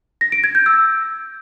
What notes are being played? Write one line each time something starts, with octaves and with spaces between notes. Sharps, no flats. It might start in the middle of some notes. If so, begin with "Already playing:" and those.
A#6
D7
G#6
G6
E6